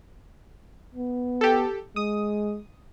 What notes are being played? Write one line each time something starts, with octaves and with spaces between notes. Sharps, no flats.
B3
G4 A4
G#3 D#6